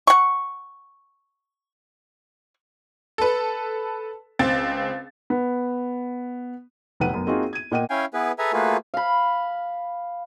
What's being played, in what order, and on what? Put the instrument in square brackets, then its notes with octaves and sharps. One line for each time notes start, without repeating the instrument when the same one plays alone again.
[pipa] F#5 C#6
[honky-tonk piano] A4 B4
C#2 C4 A6
[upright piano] B3
[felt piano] F1 B1 C3 B4 F#5 D#7
F#2 B3
A#3 C4 D#4 F4 F#4 G#4
G#6 D#7
A#2 D#5 F#5 G5 D#7
[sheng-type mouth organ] C#4 E4 F5 G5 G#5
B3 E4 G#4 B4
G#4 A4 B4 E5 G#5 A#5
A3 A#3 F4 F#4 G#4 B4
[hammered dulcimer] F5 B5